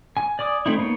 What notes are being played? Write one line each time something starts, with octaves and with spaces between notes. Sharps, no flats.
G#5
D5 G#5 D6 D#6
A3 C4 D#4 E4
A#3 B3 D#4 C#5